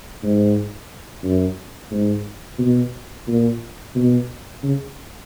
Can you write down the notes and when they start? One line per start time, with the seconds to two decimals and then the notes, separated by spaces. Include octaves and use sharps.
0.23 G#2
1.23 F#2
1.91 G#2
2.59 B2
3.28 A#2
3.95 B2
4.63 C#3